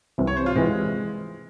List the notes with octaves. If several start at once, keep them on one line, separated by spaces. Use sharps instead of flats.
C2 C3 E3
C#5
C5
F4
C3 E3 G#3